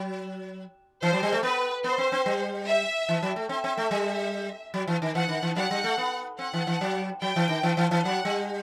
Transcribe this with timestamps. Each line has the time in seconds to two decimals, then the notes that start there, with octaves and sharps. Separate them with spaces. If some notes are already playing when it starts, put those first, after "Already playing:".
Already playing: F#3
1.02 E3 C5
1.13 F#3
1.23 G3
1.33 A3
1.43 B3 B4
1.84 B3 C5
1.98 C4
2.12 C4
2.26 G3
2.67 E5
3.09 E3
3.23 F#3
3.36 A3
3.49 C4 E5
3.64 C4
3.78 A3
3.91 G3
4.74 F#3
4.88 E3
5.02 D#3
5.15 E3 F#5
5.29 D#3
5.43 E3
5.56 F#3 F#5
5.71 G3
5.84 A3
5.98 B3
6.39 C4 F#5
6.53 E3
6.67 E3
6.81 F#3
7.22 F#3 G5
7.36 E3
7.49 D#3
7.63 E3
7.77 E3
7.91 E3
8.04 F#3 F#5
8.25 G3